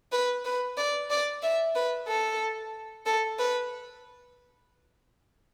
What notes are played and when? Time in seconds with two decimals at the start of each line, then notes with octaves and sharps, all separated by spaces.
0.12 B4
0.45 B4
0.78 D5
1.10 D5
1.43 E5
1.75 B4
2.08 A4
3.06 A4
3.39 B4